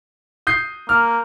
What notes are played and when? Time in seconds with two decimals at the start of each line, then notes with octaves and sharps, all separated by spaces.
0.47 D#6 G6 C7
0.89 A#3 F6